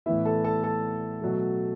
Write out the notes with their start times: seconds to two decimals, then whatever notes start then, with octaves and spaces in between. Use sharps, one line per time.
0.06 A2 E3 B3 E4 E5
0.25 A4 A5
0.44 A4 A5
0.63 A4 A5
1.22 B2 F#3 A3